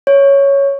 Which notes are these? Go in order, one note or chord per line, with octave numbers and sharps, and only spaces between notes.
C#5